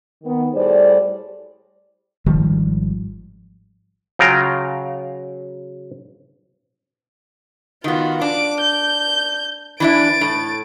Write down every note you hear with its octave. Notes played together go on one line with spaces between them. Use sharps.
D#3 B3
A2 G3 G#4 C5 D5
G#1 D#3 F3 G3
C#3 F#3 F4 G5 A#5
D#3 B3 F4 F#4
D4 D6
G6
E3 D4 E4 A6 D7
A2